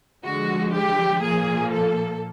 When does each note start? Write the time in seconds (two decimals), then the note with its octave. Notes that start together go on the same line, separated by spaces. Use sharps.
0.23 D3 F3 G#3 F#4
0.72 G4
1.21 A#2 F3 A#3 G#4
1.71 A4